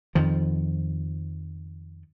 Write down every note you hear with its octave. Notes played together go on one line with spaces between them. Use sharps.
F2 D#3 F3